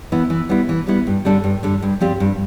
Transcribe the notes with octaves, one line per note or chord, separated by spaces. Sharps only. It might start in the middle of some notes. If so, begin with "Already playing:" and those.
E3 B3 E4
E3
G3 B3 E4
E3
G3 B3 E4
G2
D3 G3 D4 A4
G2
D3 G3 D4 A4
G2
F3 C4 G4 D5
G2